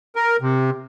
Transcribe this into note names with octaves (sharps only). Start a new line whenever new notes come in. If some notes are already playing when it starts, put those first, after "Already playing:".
A#4
C3